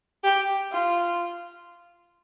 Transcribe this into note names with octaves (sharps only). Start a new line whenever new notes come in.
G4
F4